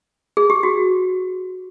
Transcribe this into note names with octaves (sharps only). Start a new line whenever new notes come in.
G#4
G4
F#4